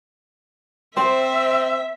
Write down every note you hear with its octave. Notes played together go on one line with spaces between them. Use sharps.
C4 C5 E5